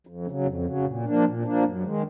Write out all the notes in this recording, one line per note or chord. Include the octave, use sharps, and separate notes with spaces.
F2
C#3 F#3
F2
C#3 F#3
A#2
F3 A#3 D4
A#2
F3 A#3 D4
F#2
D#3 G#3